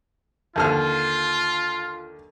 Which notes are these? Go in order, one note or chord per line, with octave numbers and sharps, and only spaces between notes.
D#2 D3 F4 F6